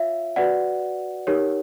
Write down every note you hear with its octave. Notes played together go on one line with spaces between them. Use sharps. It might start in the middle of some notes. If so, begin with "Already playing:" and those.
Already playing: F4 C#5 E5 F5
F#4 B4 D5 F#5
D#4 G4 A#4 C#5